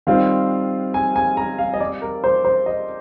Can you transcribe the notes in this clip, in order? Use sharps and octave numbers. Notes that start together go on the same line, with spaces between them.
D#3 G3 C4 F4 F5
G#5
G#5
A#5
F5
D#5
D5
A#4
C5
C5
D#5